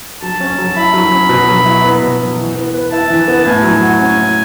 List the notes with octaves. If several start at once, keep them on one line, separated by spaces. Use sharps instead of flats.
F#3 A5
C#4
F#3
E4 B5
F#3
C#4
B2
F#3
E4
B3
B2
F#3
E3
B3
B4
E4 A5
E3
B3
A2 G#5
F#3
F#4
C#4
A2